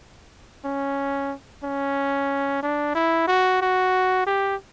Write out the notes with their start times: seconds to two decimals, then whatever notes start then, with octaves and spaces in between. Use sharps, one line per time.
0.65 C#4
1.64 C#4
2.63 D4
2.95 E4
3.28 F#4
3.62 F#4
4.27 G4